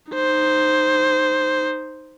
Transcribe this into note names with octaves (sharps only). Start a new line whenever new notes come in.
D#4 C5